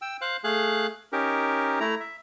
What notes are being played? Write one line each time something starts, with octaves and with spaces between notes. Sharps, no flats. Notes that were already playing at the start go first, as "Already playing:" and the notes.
G5 E6
C5 F5 F#6
A3 G#4 F5 F#6
C#4 D#4 G4 A#4
A3 E4 A#5
E5